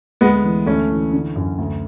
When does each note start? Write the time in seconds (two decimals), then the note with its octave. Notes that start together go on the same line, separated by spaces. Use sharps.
0.21 D2 G#3 B3
0.44 E3
0.66 D2 A3 C#4
0.90 E3
1.13 D3
1.36 F#2
1.58 D2